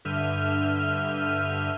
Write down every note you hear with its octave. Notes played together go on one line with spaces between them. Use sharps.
G2 D3 E5 F6 G6 D#7